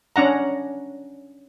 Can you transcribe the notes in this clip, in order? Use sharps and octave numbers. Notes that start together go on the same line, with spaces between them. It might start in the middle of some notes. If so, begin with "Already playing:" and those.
C#4 D4 F#5 A#5